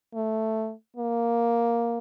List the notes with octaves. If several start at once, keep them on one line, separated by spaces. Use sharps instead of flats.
A3
A#3